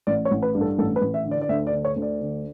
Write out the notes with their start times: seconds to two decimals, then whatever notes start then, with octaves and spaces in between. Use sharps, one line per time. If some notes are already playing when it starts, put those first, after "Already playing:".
0.07 A1 D5
0.25 C#5
0.31 A1
0.42 B4
0.55 G2
0.61 A4
0.78 A1 A4
0.96 B4
1.01 A1
1.14 E5
1.25 D3
1.31 D5
1.42 D5
1.49 D2 E5
1.67 D5
1.72 D3
1.85 C#5
1.96 D2
2.02 D5
2.20 D3